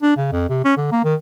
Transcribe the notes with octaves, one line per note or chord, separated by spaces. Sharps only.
D4
C#3
F2
C3
C#4
D3
A#3
D#3